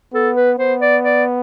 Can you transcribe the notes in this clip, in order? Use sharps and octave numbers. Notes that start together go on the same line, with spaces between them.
B3 A4
B4
B3 C5
D5
D5